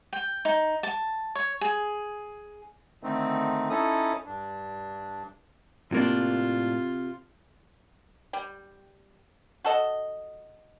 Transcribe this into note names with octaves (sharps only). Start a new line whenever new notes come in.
G5
D#4
A5
C#5
G#4
D3 D#3 A3 C4 D#4
C#4 D#4 E4 A4 D#6
G2 D4
A2 C3 A#3 D4 F4
G3
F#4 A4 D#5